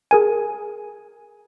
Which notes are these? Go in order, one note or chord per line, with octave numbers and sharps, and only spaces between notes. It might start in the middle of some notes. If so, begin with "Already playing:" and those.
G#4 A#4 G#5